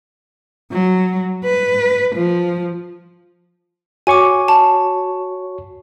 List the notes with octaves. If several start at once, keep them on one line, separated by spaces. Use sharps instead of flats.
F#3
B4
F3
F#4 C#5 G#5 C#6 D6
A5